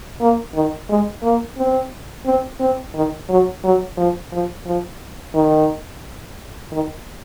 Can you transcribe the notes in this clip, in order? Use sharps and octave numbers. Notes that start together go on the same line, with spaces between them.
A#3
D#3
G#3
A#3
C4
C4
C4
D#3
F#3
F#3
F3
F3
F3
D#3
D#3